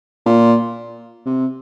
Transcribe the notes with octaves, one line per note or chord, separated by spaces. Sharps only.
A#2
C3